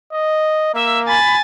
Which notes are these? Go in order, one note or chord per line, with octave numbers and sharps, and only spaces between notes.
D#5
A#3 E5
G#5 B5 A6